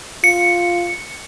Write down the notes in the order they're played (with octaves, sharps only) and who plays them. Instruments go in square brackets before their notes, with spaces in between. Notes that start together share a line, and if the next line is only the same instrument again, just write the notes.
[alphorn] F4 [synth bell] C#7